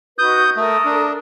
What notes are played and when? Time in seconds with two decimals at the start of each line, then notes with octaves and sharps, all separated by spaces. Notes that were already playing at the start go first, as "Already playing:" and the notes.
0.19 D#4 F#4 B4 D#6 G6
0.56 A3 A4 A#4 D#6
0.85 D4